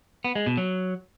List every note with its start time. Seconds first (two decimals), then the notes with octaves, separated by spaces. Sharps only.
0.25 B3
0.35 G#3
0.46 B2
0.57 F#3